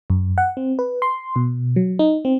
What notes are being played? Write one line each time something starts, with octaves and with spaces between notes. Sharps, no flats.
F#2
F#5
C4
B4
C6
B2
F#3
D#4
C4